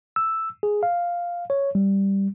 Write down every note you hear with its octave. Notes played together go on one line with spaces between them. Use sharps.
E6
G#4
F5
C#5
G3